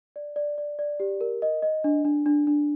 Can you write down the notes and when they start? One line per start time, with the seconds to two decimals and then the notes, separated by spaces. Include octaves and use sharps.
0.16 D5
0.36 D5
0.58 D5
0.79 D5
1.00 G4
1.21 A#4
1.42 D#5
1.62 D#5
1.84 D4
2.05 D4
2.26 D4
2.47 D4